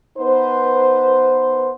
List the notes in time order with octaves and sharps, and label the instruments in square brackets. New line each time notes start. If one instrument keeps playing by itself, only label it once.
[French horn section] B3 D#4 B4 C5